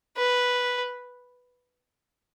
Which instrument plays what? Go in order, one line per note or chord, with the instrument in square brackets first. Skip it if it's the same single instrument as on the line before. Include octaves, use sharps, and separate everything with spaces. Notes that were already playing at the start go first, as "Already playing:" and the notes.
[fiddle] B4